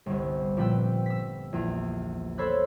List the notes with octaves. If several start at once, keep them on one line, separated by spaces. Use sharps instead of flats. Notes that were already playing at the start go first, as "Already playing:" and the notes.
G1 C2
A#2 F3 C4 B4 G5 E6
E6 B6
A#1 E2
A4 C5 C#5 B5 E6 F#6